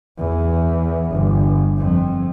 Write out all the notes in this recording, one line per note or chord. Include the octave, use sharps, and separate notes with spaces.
E2
G1
F2